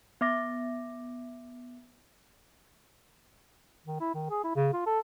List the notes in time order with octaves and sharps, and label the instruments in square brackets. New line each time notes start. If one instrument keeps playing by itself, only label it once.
[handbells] B3 E5 D6 A#6
[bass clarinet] D#3
E4
D#3
G#4
E4
C#3
F4
A4